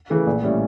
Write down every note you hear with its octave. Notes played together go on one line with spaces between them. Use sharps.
C#3 E3 A3
A#1
A2 G3 C#4 E4